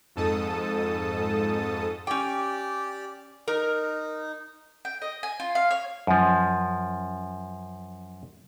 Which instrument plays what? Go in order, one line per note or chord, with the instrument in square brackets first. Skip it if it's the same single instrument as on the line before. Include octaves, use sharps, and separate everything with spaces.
[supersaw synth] F2 G#2 A4 A5 D#6
[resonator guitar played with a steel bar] C#4 G5 [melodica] G4 D5
[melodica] D#4 [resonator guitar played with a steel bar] A#4
[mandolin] G5
D#5
G#5
F4
F5
C#5
[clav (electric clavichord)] F#2 F3